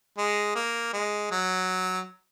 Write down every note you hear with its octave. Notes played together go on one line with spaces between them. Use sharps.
G#3
A#3
G#3
F#3